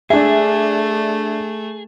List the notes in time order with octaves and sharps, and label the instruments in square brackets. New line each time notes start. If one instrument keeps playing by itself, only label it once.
[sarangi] A3 [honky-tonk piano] D4 E5 [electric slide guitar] G#4